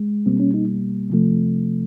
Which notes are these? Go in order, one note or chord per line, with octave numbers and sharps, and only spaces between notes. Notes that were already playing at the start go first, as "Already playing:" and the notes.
Already playing: G#3
B2 G3 A#3 C4
C#4
D#4
C3 F3 A3